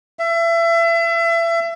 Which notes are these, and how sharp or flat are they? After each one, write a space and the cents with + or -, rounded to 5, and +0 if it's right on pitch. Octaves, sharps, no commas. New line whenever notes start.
E5 +30